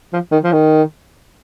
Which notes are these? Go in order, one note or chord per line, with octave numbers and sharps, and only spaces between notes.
F3
D#3
F3
D#3